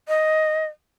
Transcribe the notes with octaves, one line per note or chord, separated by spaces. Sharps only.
D#5